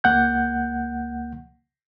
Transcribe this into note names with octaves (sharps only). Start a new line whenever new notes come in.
C#2 A#3 F#5 G6